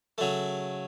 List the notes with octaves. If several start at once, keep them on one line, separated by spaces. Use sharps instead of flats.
C#3 F#3 A3